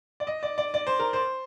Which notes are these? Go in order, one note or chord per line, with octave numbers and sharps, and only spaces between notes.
D5
D#5
D5
D5
D5
C5
A#4
C5